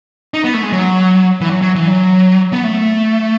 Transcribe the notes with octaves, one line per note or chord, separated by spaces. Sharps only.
D#4
B3
A3
G#3
F#3
E3
F#3
F#3
E3
F#3
B3
A3